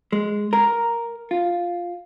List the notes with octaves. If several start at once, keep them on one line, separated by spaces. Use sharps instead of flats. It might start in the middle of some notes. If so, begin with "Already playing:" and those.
G#3
A#4
F4